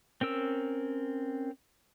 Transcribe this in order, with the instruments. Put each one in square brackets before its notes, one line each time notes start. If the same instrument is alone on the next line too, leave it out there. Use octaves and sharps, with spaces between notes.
[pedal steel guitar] C4 C#4 A#4 E6